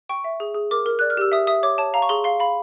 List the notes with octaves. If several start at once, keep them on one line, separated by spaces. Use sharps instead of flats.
G5 C#6
E5
G#4
G#4
A#4 D6
A#4
D5 F#6
F6
G4 E6
E5 D#6
E5 D#6
C#5 D6
C#5 A5
F5 A#5
C#6
G#4 C6
F5 C6
F5 B5